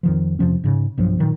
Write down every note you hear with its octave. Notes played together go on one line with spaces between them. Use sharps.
F2 D#3 F3
F2 C3 F3 C#4
G#2 C#3
B1 G2 F3 F#3
A#2 D#3 F#3